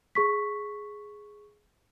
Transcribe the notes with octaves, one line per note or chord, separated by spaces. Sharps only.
G#4 C#6 B6